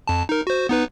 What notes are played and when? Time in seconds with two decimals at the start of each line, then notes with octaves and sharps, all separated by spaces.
0.08 F2 A5
0.29 D#4 A#4
0.47 F#4 C5
0.69 B3 D#4 B4